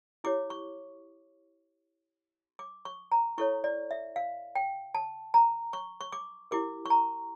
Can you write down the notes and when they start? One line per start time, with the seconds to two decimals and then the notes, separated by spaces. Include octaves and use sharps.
0.24 E4 G4 C#5 D6
0.50 C#6
2.59 D6
2.85 C#6
3.12 A#5
3.38 E4 A4 C#5 C#6
3.64 D5
3.91 E5
4.16 F5
4.55 G5
4.95 A5
5.34 A#5
5.73 C#6
6.01 C#6
6.12 D6
6.51 E4 G4 A#4 D6
6.86 C#6
6.90 A#5